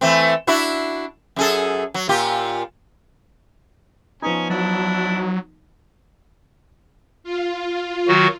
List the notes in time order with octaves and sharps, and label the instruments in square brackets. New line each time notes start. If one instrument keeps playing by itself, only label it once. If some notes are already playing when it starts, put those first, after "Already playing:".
[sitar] E3 A3 C4
D4 E4 F#4
F#2 G#4 A4
F#3
A#2 F4 G4
[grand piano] F3 B3 D#4 [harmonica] C#4 G#5
[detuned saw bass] F#3 [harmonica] D4 E4
[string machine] F4
[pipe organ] D#3 F#3 F#4